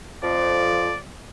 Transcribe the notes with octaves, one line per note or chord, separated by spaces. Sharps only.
F2 F3 D5